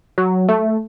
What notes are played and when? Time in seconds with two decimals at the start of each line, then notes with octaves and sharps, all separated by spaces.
0.18 F#3
0.49 A3